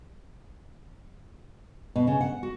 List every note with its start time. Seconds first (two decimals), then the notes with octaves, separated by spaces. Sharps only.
1.96 B2
2.07 C#3
2.21 F#5
2.43 F#4